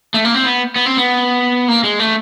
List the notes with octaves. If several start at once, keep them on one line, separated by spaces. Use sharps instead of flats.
A3
A#3
C4
B3
B3
C4
B3
A#3
G#3
A3